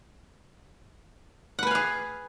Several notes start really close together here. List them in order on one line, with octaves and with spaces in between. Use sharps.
F#5 B4 G#5 F5 G#4